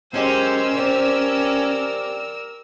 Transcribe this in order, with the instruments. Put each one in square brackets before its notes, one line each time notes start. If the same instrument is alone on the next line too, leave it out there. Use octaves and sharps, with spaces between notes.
[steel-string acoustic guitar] F#3 G#3 G4 [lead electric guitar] C#4 [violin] A#4 E6 [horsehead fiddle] C5
[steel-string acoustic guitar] G3 C4 [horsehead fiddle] D5